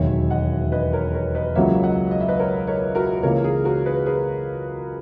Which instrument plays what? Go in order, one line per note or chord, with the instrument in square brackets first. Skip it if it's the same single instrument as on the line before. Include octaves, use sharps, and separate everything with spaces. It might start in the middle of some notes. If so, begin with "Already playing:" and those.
Already playing: [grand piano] E1 D#2 D#3 F#3 [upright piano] C#5 E5
[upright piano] D#5 F#5
B4 D#5
A#4 C#5
A#4 C#5
B4 D#5
[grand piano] C#2 C#3 F#3 A#3 [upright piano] C#5 E5
[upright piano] D#5 F#5
D#5
E5
B4 D#5
A#4 C#5
A#4 C#5
F#4 A#4
[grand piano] C#2 C#3 E3 A#3 [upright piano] A#4 C#5
[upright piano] G#4
F#4 A#4
G#4 B4
G#4 B4